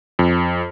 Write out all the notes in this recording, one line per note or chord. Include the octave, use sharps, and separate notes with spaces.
F2